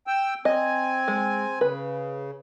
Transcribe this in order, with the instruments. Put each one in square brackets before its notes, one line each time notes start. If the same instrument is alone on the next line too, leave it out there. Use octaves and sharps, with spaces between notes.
[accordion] G5 E6
[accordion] C4 G#5 [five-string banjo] D#5
[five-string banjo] G#3
[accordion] C#3 [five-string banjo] B4